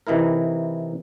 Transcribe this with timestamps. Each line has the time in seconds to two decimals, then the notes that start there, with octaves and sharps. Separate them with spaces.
0.07 C3 E3 D#4 E4 A#4